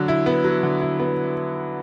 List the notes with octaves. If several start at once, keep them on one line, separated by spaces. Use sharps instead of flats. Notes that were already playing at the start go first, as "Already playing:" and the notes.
Already playing: D3 F#3
E4
B3
F#3
D3
E4
B3